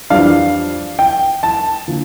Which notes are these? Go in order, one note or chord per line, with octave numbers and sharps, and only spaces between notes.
F2 E3 G3 D4 F5
G5
A5
D3 F3 A#3